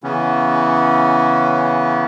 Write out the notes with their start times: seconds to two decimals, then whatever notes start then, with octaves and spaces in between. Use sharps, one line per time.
0.04 C#3 E3 B3 C#4